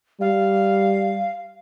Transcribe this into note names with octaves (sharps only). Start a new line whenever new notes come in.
G3 F5